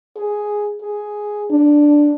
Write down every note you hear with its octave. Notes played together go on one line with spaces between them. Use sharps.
G#4
G#4
D4